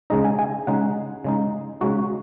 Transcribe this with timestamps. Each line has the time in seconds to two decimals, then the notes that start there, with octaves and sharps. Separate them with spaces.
0.10 C#3 G#3 D#4 D#5
0.25 G#5
0.39 G#5
0.67 C#3 G#3 D#4 F#5
1.24 C#3 G#3 D#4
1.81 C#3 G#3 D#4 F#4